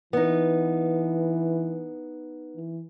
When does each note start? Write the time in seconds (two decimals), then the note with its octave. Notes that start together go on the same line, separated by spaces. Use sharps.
0.13 E3 B3 D#4
2.56 E3